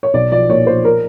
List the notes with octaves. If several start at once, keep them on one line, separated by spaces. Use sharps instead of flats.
C#5
B1 D5
F3 D5
A#2 C#5
F3 C5
A#4